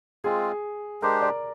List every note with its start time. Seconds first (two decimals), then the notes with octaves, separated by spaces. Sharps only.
0.24 G#3 C4 F4 G#4
1.02 G#3 D4 G4 A#4 C5
1.22 D5